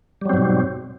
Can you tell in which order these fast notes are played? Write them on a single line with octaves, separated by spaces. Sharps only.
G3 F#3 C4 G#2 B2